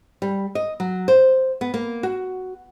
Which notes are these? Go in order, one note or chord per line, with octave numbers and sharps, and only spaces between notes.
G3
D#5
F#3
C5
B3
A#3
F#4